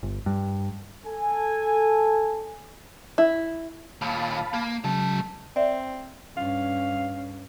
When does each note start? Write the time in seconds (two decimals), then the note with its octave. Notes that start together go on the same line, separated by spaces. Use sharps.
0.03 G1
0.26 G2
1.07 A4 G#5
3.18 E4
4.01 D#2 A#2 F5 A5 B5
4.54 A#3
4.84 C#3 F#3 G#3 A5
5.56 C4 D5 E5
6.37 G2 C#4 F5